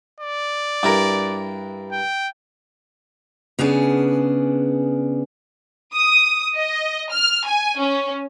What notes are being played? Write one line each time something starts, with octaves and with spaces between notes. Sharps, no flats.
D5
G2 E4 A#4
G5
C#3 B3 D4 G#4
D#6
D#5
F6
G#5
C#4